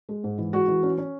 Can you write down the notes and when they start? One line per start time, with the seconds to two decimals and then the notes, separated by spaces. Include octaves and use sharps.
0.09 G#3
0.24 G#2
0.38 E3
0.53 G#3 F#4
0.68 E3
0.83 C#4
0.98 C#4